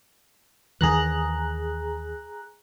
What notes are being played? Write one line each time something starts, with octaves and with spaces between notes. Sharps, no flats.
D#2 D#3 E3 G#4 A#5 F#6